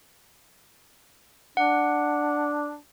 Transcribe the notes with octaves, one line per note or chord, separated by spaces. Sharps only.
D4 F#5